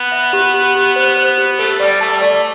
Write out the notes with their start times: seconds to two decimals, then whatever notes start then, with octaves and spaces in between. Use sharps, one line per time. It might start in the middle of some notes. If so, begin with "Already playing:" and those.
Already playing: B3
0.12 E5
0.33 G4
0.54 G4
0.75 G4
0.96 C5
1.17 C5
1.38 G4
1.59 A3 A4
1.80 G3 D5
2.01 A3 A5
2.12 G3
2.21 A3 D5